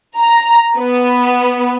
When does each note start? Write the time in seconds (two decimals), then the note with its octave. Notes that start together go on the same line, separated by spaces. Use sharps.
0.18 A#5
0.78 B3